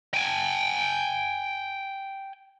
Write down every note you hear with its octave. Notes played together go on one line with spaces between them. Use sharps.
G5 G#5